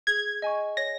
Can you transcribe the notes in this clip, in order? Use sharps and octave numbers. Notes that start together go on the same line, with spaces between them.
G#4 G#6
D#5 G#5 C#6
C#5 A#6